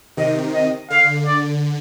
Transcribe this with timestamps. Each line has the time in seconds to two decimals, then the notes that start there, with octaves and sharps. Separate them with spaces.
0.17 C3 D#3 D#5
0.54 D#5
0.90 D3 F5
1.26 D5